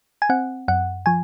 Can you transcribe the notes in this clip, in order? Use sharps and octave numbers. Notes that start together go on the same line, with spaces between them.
G#5
C4 F#5
F#2 F#5
F3 G#5